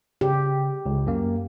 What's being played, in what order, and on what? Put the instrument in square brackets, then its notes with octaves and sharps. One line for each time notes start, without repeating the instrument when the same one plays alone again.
[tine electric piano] C#3 [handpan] G4
[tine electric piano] C#2
F#2 A#3